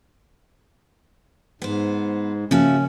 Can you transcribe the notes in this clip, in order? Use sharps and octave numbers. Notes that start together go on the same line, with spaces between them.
G#2 B3 C5
C#3 F3 A#3 C#4 F#4 E5